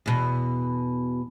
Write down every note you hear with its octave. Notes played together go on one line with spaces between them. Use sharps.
E2 B2